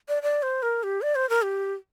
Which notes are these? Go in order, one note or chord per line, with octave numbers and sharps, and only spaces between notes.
D5
D5
C5
A#4
G4
D5
C5
A#4
G4